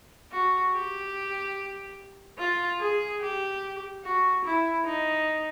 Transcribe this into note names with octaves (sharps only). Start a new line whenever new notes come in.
F#4
G4
F4
G#4
G4
F#4
E4
D#4